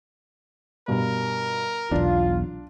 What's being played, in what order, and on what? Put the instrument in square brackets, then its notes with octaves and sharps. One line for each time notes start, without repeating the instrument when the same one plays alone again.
[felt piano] G2 B2 [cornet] A#4
[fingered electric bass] B1 E2 [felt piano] D4 [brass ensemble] F4